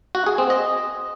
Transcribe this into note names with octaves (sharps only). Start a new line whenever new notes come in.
F#4
G#4
C4
D#5